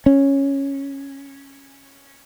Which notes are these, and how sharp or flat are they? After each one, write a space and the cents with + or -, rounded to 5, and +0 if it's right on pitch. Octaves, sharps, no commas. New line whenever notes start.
C#4 -5